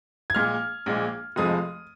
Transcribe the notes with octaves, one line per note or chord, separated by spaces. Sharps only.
G#6
A#1 A#2 G#3 F6
A#1 A#2 G#3
F1 F2 F3 G#3 D#6